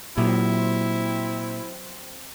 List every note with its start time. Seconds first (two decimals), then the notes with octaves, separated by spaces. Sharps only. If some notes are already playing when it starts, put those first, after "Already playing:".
0.18 A#2 F#3 C4 E4 G4 E5